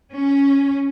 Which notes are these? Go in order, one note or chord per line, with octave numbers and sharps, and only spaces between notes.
C#4